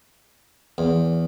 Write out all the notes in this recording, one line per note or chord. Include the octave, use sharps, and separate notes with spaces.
E2